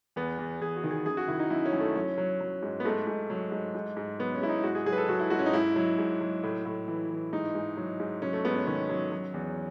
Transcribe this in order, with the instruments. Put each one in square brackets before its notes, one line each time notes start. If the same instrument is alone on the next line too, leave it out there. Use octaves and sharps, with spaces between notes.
[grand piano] E2 B3
E2
E2 G#4
F#4
D#3
G#4
F#2 G#4
F#4
D#3 E4
D#4
F#2 E4
C#4
F#2
A3
F#3 C#4
F#3
F#3
G#2
B3
G#2 A3
G#2
F#3
G#2
G#2
G#2
F#3 B3
C#4
G#2 E4
D#4
G#2 F#4
G#4
F#3 G#4
B4
A4
F#3 F#4
E4
G#2 F#4
C#4
D#4
G#2 E4
F#3
G#2
F#3
A2
A2
E3
E3
G#2 D#4
G#2
F#3
G#2
F#3 C#4
A3
G#2 B3
C#4
D#3 C#4
F#3
F#3
E2